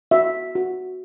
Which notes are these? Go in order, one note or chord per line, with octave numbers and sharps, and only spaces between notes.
F#4 E5
F#4